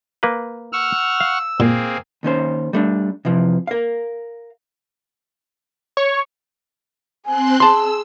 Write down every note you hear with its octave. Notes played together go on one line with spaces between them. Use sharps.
A#3 B4
F#5 C#6 E6 F6
F5
A#2 A#3 C4 G#4
D#2 D#3 C#4 C5
G3 A3 D4
C3 E3 F3
A#4 F5
C#5
C4 G#5 C6 F#6
G#4 A5 C6 E6